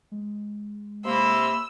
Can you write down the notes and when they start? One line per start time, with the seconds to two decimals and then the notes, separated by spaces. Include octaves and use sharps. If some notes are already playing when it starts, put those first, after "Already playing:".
0.12 G#3
1.05 C3 A#3 B5 C6 E6